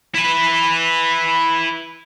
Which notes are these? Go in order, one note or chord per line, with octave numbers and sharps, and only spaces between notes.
E4 B4